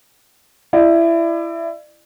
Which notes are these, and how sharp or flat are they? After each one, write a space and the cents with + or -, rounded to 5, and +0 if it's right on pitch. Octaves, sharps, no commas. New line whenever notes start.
E4 +20 D5 +35